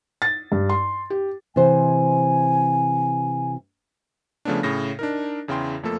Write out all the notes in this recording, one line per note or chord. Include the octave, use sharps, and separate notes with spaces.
A6
G2
C6
G4
C3 E3 C5 G#5
C#3 F3 A3 B3 C#4 D4
A2 C#3 A#6
D4 D#4 A#4
E2 C#3 E4 G5 C6
F2 F3 A3 A#3 A4